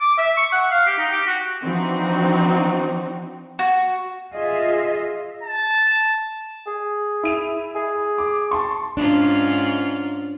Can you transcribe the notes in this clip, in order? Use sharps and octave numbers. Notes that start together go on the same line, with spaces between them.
D6
E5
C#6
F#5
F5
G4
D#4
G4
F#4
E3 F3 C4 D4 D#4 F#4
F#4
F4 G#4 D#5 E5
A5
G#4
E4 D#7 F7
G#4
D6
A5 C6 C#6
G#2 C#4 D4 F4